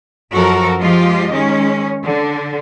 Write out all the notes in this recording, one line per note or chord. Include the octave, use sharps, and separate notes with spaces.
F#2 F3 F#4 A4 A#4
F3 G#3 F4 G4 D#5
D#3 G#3 C#4
D3